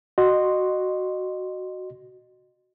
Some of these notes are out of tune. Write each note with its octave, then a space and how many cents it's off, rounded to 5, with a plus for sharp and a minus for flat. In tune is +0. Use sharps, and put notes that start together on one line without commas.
F#4 +5 D#5 -25 C6 +0